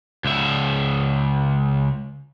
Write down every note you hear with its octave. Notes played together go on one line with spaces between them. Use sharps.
C#2 E5